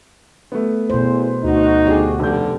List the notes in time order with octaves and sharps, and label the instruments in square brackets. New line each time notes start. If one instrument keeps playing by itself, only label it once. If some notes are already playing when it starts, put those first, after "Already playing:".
[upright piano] A3 B3
[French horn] E2 [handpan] B2 C5
[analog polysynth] D2 F#4 [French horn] D#4
[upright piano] D4 G#4 [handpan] G4
[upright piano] F1 G6 [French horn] D3